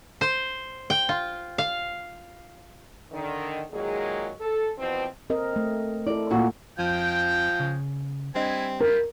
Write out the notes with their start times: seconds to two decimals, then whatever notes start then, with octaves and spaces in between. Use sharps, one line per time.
0.21 C5
0.90 G5
1.09 F4
1.58 F5
3.12 D3 D#3
3.71 A#2 D#3 F#3 G#3 G#4
4.40 A4
4.77 E2 B2 F3 C4
5.30 C4 A#4 D#5
5.53 A3 D#5
6.07 E4 A4 D5
6.30 A#2 F4 F#4
6.79 F2 F3 G#3 G5
7.60 C#3
8.35 G3 C4 D4 E4 D#5 G#5
8.80 E4 F4 G4 A#4